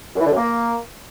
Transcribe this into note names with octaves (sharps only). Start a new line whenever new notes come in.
F#2
E3
D3
F#2
A#3